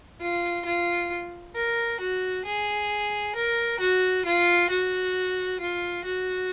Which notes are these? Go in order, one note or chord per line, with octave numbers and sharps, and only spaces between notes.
F4
F4
A#4
F#4
G#4
A#4
F#4
F4
F#4
F4
F#4